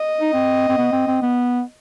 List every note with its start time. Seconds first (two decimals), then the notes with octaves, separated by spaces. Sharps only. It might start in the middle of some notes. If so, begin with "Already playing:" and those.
Already playing: D#5
0.21 D#4
0.33 C4
0.69 C4
0.78 B3
0.92 C4
1.08 C4
1.22 B3